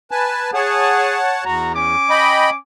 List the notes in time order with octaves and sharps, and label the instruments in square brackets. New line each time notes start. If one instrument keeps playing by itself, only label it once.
[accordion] B4 G#5 A5
[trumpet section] G#4 [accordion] C#5 F#5 A5
[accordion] E2 [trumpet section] F#4 A#5
[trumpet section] C#4 G#5 D6
[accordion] D#5 G5 B5